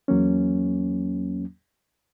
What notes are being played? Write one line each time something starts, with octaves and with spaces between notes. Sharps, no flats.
E2 F#3 A#3 C#4